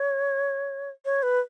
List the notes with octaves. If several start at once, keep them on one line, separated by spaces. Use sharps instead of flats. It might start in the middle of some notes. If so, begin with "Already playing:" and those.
Already playing: C#5
C#5
B4